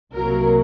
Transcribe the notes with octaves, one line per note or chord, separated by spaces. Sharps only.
C2 C3 F#3 A#3 A#4